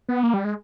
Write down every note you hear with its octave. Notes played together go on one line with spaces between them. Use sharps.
B3
A#3
G3
G#3